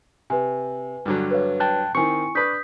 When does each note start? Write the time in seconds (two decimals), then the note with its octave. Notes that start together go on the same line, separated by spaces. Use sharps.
0.30 C3 B4 G#5
1.06 G2 D3 F#3
1.31 B4 C#5 F5
1.60 G5 A5 F#6
1.95 D#3 C4 E4 G#5 C#6 C#7
2.35 D4 B4 D#6 G6 B6